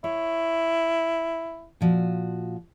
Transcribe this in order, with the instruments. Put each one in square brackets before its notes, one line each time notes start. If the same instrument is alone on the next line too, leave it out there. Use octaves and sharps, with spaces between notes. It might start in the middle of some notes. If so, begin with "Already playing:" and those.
[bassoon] E4 [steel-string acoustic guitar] C#5
[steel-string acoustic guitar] A#2 F3 F#4